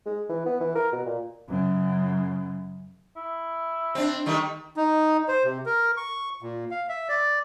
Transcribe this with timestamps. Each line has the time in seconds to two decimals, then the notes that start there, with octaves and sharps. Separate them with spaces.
0.06 G#3
0.29 E3
0.46 B3
0.60 E3
0.75 A#4
0.92 B2
1.05 A#2
1.49 F#2 C#3
3.17 E4
3.95 C4 D4
4.26 D#3 G3 A3
4.77 D#4
5.28 C5
5.44 C3
5.66 A#4
5.97 C#6
6.43 A#2
6.71 F5
6.89 E5
7.09 D5